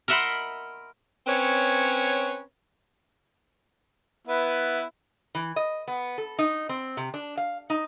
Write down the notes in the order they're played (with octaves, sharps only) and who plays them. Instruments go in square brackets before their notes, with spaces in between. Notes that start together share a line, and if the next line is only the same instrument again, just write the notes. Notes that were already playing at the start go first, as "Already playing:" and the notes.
[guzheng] A#4 D#5 E5 F#5 B5 C6
[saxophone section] C4 C#4 B4 C#5
[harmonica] B3 E4 B4
[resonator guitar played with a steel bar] E3
D#5
B3
A4
D#4
C4
C3
D4
F5
D#4